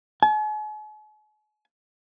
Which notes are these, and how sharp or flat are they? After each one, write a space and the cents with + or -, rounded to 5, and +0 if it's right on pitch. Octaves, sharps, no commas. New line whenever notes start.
G#5 +45